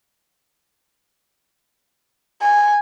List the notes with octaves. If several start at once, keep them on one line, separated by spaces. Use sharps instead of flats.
G#5